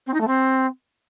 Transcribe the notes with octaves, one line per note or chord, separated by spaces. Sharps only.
C4
D#4
A3
C4